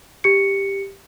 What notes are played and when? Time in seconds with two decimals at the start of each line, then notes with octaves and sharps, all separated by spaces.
0.24 G4 C#7